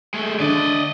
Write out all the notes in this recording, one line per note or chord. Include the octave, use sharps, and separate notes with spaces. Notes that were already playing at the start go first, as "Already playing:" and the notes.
G#3 A3
D3 D5 D#5 D#7